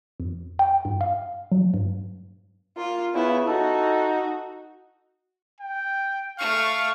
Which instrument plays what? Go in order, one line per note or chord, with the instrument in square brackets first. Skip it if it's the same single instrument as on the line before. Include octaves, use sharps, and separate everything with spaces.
[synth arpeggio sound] F2
G5
G2
F5
F#3
G2
[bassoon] A#3 [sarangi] F4
[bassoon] C#3 [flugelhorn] B3 [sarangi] E4
[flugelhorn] D#4 [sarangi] F#4 [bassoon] A4
[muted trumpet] G5
[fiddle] A3 C#6 [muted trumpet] F5